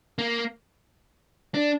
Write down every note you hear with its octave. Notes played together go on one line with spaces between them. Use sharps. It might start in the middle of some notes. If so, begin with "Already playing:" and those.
A#3
D4